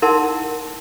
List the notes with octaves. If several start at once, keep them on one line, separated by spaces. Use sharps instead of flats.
D#4 E4 A#4 F#5 A5 C6